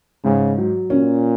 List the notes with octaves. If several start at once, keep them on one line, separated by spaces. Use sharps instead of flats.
G#2 C#3
F#3
A#2 C#4